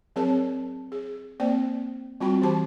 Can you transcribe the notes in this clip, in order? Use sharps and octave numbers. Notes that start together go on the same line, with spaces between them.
F#3 C4 G#4 A#4 C#5 A5
G#4
A#3 C4 C5 D5 G5
G3 C4 F4 F#4 G5 B5
E3 G4 C5 A5 D6